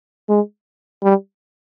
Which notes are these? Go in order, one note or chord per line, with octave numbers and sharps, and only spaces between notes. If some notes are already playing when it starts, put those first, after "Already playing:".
G#3
G3